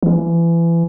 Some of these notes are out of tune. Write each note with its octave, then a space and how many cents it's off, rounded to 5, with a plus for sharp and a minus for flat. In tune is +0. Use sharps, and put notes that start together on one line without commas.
E3 +30